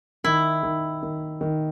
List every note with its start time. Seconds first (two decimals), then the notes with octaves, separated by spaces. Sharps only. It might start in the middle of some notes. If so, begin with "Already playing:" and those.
0.24 D#3 E4
0.63 D#3
1.03 D#3
1.41 D#3